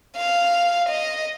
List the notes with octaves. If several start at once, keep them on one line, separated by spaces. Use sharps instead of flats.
F5
D#5